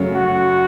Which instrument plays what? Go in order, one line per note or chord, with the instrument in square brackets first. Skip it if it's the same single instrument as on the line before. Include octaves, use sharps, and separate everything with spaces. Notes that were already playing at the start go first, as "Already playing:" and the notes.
Already playing: [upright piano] F#2 C#3 F#3 A3 C#4
[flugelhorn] F#4